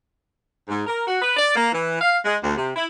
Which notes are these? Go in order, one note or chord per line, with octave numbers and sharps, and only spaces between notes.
G#2
A#4
F#4
B4
D5
A#3
E3
F5
G#3
D2
C3
E4